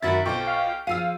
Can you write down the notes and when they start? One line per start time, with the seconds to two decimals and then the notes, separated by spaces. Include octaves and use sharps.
0.03 F#2 D#3 F#4 A#4 E5 B5 A6
0.26 B1 F4 A4 C5 G5 C#6
0.47 F5
0.87 F3 F4 G#4 F5 E6 C7 D#7